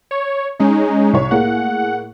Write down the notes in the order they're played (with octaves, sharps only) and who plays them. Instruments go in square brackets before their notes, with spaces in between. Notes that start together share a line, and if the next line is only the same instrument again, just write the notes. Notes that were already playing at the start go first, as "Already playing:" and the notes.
[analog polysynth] C#5
G#3 C#4 D#4
[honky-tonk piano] C2 C#5
[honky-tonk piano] A2 A#3 G#4 [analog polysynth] F#5